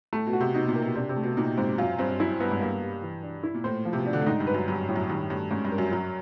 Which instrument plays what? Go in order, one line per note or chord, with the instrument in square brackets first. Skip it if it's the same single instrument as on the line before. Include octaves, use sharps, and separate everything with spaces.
[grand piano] A2 [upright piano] A3
[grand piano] B2
[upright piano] F#4
[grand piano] C3
[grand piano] B2 [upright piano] D#4
[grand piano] A#2
[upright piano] A#4
[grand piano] B2
[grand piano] C3 [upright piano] D4
[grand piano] C3
[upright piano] A3
[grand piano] B2
[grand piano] A#2 [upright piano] D#4
[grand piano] G#2 [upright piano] C4
[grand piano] F#2 [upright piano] F4
[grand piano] G2 [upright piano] C4
[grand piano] F#2 [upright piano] E4
[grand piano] G2 [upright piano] B3
[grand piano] G#2
[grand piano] G2 [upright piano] A#3
[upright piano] G3
E3
D4
E4
[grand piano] A#2
[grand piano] A2 [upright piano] C5
[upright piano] F3
[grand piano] C3
B2
[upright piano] D4
[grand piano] D3
A2
[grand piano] G#2 [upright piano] D#4
[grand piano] G2
[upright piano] B4
[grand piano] F#2
[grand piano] G2 [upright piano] F#3
[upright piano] A2
[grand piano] F#2
[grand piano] G2 [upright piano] D#3
[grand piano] G2 [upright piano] A3
[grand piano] G#2 [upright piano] C#4
[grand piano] G2
[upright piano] A#4
[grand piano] F#2
[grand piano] F#2 [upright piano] F#3